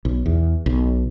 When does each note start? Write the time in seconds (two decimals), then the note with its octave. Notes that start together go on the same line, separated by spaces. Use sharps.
0.05 B1
0.26 E2
0.66 B1